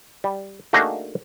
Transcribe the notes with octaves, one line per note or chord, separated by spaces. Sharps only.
G3
A3 A#3 D4 D#4 F#4 G#4